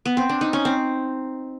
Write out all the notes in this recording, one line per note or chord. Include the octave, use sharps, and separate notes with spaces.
B3
C4
D4
D#4
C#4
C4